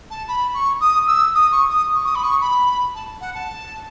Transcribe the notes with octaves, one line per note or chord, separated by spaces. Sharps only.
A5
B5
C#6
D#6
E6
D#6
C#6
D#6
C#6
D#6
B5
C#6
B5
A5
F#5
A5